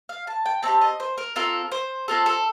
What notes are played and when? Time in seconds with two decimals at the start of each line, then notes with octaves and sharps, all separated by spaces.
0.09 F5
0.27 A5
0.46 G5
0.63 C4 D#4 G4 A5
0.81 D#5
1.00 C5
1.18 A#4
1.36 C4 F4 A4 A#4
1.72 C5
2.08 C4 F4 A4
2.26 A4